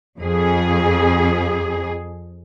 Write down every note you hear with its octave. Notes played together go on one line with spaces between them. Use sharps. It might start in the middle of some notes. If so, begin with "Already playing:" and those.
F2 G#4